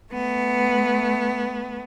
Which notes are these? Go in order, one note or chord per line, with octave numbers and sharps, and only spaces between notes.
A3 B3